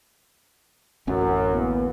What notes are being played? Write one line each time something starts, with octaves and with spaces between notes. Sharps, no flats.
D1 A1 F#2 C#4
E3 A#3 B3